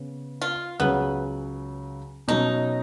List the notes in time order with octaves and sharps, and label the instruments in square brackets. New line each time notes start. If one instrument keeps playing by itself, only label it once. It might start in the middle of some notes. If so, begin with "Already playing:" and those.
Already playing: [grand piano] C#3 B3
[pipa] F4
[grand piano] C#2 C#3 F#3 [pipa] B3
[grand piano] B2 F#3 C#4 [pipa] D#4